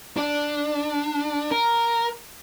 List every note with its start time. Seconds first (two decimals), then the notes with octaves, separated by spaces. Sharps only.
0.17 D4
1.51 A#4